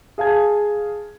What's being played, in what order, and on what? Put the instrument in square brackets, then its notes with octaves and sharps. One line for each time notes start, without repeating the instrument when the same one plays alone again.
[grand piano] G#4 F5 A5 G#6